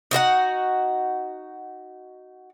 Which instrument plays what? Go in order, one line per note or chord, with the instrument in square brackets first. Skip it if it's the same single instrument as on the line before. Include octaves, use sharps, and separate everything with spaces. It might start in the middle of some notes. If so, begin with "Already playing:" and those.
[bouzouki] D#4 F#4 A#4 F#5